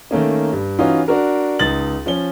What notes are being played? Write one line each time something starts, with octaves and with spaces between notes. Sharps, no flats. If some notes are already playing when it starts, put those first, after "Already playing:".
D#3 A3 A#3 C#4
G2
E3 C#4 D#4 F4 F#4
D4 F#4 A#4
C#2 D#4 A6 F#7
F3 C#4 G7